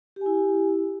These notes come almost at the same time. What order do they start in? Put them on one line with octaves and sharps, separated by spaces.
G4 G#5 E4